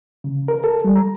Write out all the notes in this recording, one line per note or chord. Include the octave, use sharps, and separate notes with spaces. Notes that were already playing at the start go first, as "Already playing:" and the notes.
C#3
A#4
A4
G3
A#5